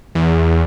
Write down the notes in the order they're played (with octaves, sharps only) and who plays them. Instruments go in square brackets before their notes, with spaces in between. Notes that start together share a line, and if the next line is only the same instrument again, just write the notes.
[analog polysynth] E2